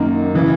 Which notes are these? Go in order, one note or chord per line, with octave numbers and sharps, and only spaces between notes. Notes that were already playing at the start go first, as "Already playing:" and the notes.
Already playing: F#2 D#3 A#3
C#3 E3